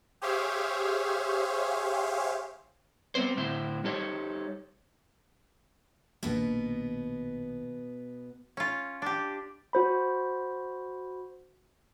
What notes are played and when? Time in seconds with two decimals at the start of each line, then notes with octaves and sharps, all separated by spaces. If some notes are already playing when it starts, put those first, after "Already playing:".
0.22 G4 G#4 C5 C#5 E5 F5
3.15 G3 B3 C4 C5
3.37 A2 D3 E4 C5
3.84 G3 D#4 G4 A4 C5 C#5
6.23 A#1 B2 D#3 B3
8.57 C#4 F4
9.02 D4 G4
9.73 F#4 C5 B5